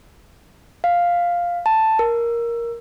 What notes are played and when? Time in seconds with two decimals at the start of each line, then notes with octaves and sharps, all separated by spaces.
0.84 F5
1.66 A5
1.99 A#4